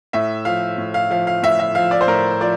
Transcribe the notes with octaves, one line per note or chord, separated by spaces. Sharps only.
A2 E5
F3 F5
A2
F5
F3 F5
F5
A2 E5
E5
F3 F5
D5
C5
A2 A#4
F3 D5